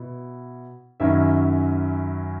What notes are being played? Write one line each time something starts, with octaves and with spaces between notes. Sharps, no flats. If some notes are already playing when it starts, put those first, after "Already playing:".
Already playing: B2 E4
F#2 D#3 F#3 C#4 E4 E5